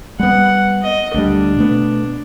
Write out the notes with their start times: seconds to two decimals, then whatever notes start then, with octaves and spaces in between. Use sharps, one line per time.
0.19 G3 B3 F#5
0.82 D#5
1.14 D2 G3 D4
1.57 B2 A3 B3